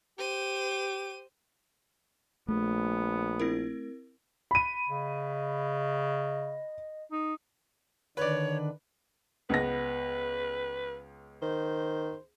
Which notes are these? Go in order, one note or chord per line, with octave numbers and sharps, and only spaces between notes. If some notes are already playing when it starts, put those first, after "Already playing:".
G4 C5 D#7
A#1 A3 B3
C4 E4 A#4
B5 D#7
C#3 D#5
D#4
D3 D#3 D4 B4 C#5 D5
C#2 B3 B4 A#6
D#3 C5